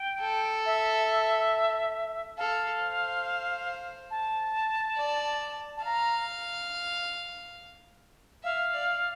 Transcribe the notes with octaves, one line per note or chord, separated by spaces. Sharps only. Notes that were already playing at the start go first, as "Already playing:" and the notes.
Already playing: G5
A4
E5
A4 F5
C5
A5
D5
A5
F5 A#5
E5 F5
D5